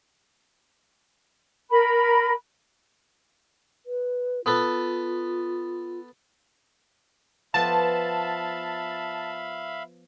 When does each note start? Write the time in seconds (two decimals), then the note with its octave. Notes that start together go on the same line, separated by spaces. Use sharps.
1.70 A#4 B5
3.86 B4
4.46 B3 F4 A4 B4
7.54 F3 B3 E5 F5 A5 B5